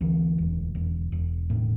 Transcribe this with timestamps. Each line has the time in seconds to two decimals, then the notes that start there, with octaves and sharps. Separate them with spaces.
0.01 D2 E3
0.38 E1
0.75 E1
1.12 E1
1.50 A2